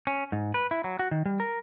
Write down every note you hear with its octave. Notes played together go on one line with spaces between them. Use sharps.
C#4
G#2
B4
E4
F#3
F#4
D#3
G3
A#4